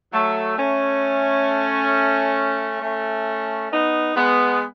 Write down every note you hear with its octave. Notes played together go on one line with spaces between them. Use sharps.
F#3 A3
A3 C#4
A3 C#4
B3 D#4
G#3 B3